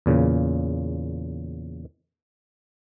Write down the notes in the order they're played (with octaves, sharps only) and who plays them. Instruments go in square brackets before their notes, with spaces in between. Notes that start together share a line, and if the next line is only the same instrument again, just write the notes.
[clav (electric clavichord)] E2 A#2 C#3